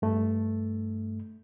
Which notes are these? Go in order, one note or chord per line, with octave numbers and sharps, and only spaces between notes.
G2 A3